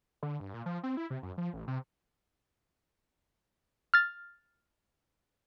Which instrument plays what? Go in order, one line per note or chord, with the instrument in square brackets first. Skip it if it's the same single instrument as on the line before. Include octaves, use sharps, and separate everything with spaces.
[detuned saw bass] D3
G2
A#2
F3
C4
E4
C3
F#2
F3
A1
C3
[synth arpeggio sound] F6 A6